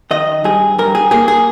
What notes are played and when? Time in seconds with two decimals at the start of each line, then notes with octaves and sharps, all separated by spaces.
0.11 D#3 D#5
0.44 G2 G#4
0.78 G2 A#4
0.95 G#4
1.11 A#3 G#4
1.28 G#4